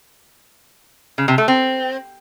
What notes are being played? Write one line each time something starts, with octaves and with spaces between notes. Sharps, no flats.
C#3
C3
A3
C4